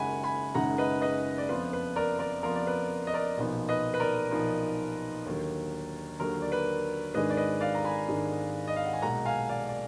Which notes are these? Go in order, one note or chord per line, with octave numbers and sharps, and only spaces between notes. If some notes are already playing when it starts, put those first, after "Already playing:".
Already playing: F#1 F#2 D#3 G#3 D#4 F#5 G#5 B5
G#5 B5
F#1 F#2 D#3 G#3 D#4 F#5 A#5
B4 D#5
B4 D#5
D5
F2 F3 B3 F4 B4
B4
A#4 D5
A#4 D5
F2 F3 B3 F4 A#4
D5
B4
D#5
A#4 D5
B1 A#2 F3 B3 D#4
B4 D#5
B4
A#4 D5
B1 A#2 F3 B3 D#4
D#2 D3 F#3 A#3
D#2 D3 F#3 A#3 A#4
D5
B4
G#1 G#2 D#3 G#3 D4 B4 D#5
D5
B4 D#5
D5 F5
A#5
G#5 B5
G#1 G#2 D#3 G#3 D4
D#5
F5
F#5
G#5
B1 A#2 G#3 F#5 A#5
F5 G#5
D5 F5
D5